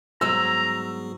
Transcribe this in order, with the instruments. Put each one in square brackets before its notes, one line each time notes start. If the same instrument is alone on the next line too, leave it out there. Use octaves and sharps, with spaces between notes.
[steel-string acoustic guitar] G#2 F#3 [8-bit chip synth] G3 B3 G#4 [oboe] A#5 [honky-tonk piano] E6